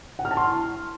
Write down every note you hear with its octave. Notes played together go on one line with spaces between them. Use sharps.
F#5
F6
A5
C6